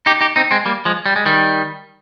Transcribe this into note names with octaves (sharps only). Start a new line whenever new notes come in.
D#4 G4
D#4 G4
C4 D#4
G#3 C4
G3 A#3
F3 G#3
G3
G#3
D#3 G3